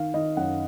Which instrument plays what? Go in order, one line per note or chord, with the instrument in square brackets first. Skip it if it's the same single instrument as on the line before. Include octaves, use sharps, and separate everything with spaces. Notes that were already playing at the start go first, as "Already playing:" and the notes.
Already playing: [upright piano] D#3 F5
D#3 D#5
F#2 F#5